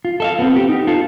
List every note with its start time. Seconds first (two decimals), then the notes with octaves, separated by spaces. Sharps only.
0.05 F4
0.20 A4 E5 F5
0.39 B3 C4
0.56 G4
0.69 D#4
0.87 F4 A4